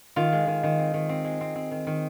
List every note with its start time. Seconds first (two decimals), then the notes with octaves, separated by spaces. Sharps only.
0.16 D#3 F4
0.32 G#3
0.47 D#3
0.63 D#3
0.79 C4
0.94 D#3
1.09 C4
1.24 G#3
1.41 C4
1.55 C4
1.71 D#3
1.87 D#3